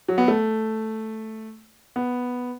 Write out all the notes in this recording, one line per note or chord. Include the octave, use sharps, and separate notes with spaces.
F#3
B3
A3
B3